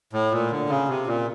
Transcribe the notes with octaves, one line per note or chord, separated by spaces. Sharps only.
A2
A#2
D3
C#3
C3
A#2